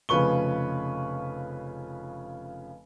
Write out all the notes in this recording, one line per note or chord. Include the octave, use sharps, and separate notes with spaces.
F1 C#3 F3 B4 C#6 G7